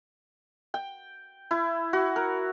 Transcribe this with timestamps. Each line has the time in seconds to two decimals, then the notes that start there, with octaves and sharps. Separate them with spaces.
0.74 G5
1.51 E4
1.93 F#4
2.16 A#4